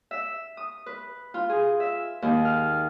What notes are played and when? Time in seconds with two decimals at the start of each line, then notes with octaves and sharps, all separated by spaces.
0.11 E5
0.57 D#6
0.86 B4
1.34 F4
1.50 G#4
1.80 E5
2.22 D#2
2.45 F6